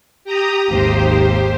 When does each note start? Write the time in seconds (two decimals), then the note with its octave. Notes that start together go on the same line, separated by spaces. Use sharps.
0.24 G4 A#5 D#6
0.68 G#1 D#2 G4 C5